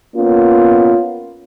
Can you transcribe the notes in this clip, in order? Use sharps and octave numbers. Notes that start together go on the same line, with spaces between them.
A#3 B3 C#4 F4